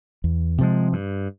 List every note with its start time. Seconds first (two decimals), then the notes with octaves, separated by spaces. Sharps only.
0.24 E2
0.58 C3 F3 G#3
0.93 G2